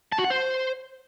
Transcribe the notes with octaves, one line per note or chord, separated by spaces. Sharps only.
A5
F#4
F#5
C5